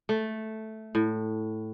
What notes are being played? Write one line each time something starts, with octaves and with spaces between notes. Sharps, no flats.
A3
A2